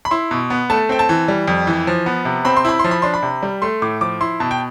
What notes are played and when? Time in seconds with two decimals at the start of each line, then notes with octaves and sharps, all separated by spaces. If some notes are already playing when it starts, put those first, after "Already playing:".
0.05 B5
0.11 E4 C6
0.31 B2
0.50 B3
0.70 A3 A5
0.89 C4 G5
0.99 A5
1.09 E3
1.28 G3
1.48 F2
1.67 E3
1.87 F3
2.06 B3
2.25 C3
2.45 C4 B5
2.57 C6
2.65 E4 B5
2.79 C6
2.84 F3
2.91 B5
3.02 D4 C6
3.14 B5
3.23 C3
3.42 G3
3.62 A3 C6
3.82 A2 D6
4.01 F3 D6
4.21 E4 C6
4.40 B2 A5
4.51 G5